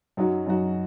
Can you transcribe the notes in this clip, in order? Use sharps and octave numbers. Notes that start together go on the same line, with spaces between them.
F#2 F#3 D#4 F#4
F#2 F#3 D#4 F#4